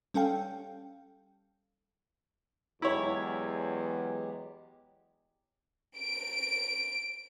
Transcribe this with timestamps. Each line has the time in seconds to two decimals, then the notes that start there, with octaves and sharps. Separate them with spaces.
0.14 G3 C#4 A4 F5 G5
2.82 E2 F#3 G#3 E4 G4 C#5
5.97 D7